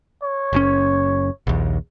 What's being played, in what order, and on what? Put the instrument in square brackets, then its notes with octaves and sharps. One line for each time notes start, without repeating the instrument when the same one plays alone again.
[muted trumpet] C#5
[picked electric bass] F#1 A2 C#4
A#1 D#2